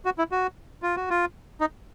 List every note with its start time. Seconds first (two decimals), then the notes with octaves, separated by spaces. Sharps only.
0.05 F#4
0.18 E4
0.32 F#4
0.83 F4
0.96 F#4
1.10 F4
1.61 D#4